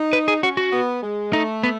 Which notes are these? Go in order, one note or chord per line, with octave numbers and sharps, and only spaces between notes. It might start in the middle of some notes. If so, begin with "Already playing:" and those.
Already playing: D#4
B4
G#4
C#4 F#4
F#4
B3
G#3
A3 D#4
B3